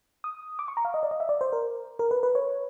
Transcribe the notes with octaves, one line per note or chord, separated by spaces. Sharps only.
D#6
D6
C#6
A#5
F5
D#5
D5
D#5
E5
D5
C5
A#4
A#4
B4
B4
C#5